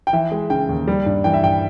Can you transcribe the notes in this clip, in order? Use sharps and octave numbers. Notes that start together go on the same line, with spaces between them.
G5
E3 E5
G#3
C#3 G5
D#2
G3
G2
E3 G5
E5
G2 G5